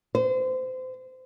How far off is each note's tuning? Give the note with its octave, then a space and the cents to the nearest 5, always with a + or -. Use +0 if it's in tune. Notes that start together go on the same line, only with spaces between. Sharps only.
C5 -25